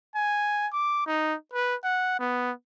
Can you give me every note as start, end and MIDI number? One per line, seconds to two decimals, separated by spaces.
0.15 0.67 80
0.73 1.04 86
1.07 1.35 63
1.53 1.75 71
1.84 2.19 78
2.19 2.51 59